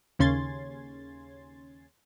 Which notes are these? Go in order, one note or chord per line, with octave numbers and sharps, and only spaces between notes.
D#2 C#3 C#4 C6 G#6 A6